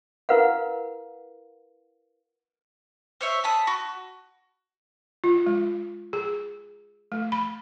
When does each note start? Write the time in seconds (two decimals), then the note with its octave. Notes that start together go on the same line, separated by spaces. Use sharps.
0.29 E4 A#4 B4 F5 F#5
3.21 C5 C#5 E5
3.44 A5 B5 D#6
3.67 F#4
5.24 F4
5.46 G#3
6.13 G#4
7.12 A3
7.32 B5